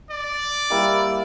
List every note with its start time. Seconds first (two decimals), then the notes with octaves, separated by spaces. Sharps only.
0.10 D5
0.70 G3 A#3 E4